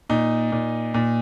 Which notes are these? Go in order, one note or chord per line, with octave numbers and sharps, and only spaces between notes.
A#2 D#4
A#2
A#2